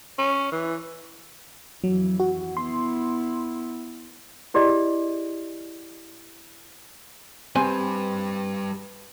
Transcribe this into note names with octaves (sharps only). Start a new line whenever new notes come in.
C#4
E3
F2 E3 F#3
F#4
B3 E4 C6
E4 G4 G#4 D5 D#5
G2 G3 C4 B4 G#5